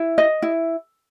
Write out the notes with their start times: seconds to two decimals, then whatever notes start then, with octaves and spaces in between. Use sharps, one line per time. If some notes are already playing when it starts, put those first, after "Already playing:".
Already playing: E4
0.18 D#5
0.42 E4